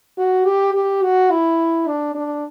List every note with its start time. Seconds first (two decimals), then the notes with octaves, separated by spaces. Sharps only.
0.18 F#4
0.45 G4
0.74 G4
1.03 F#4
1.31 E4
1.87 D4
2.15 D4